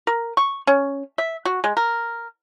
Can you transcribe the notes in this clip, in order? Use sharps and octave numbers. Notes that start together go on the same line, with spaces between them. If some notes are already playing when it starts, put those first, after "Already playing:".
A#4
C#6
C#4
E5
F#4
G#3
A#4